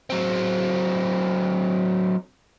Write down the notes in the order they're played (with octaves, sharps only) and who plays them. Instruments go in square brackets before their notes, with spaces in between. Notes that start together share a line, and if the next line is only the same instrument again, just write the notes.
[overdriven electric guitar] F#3 C4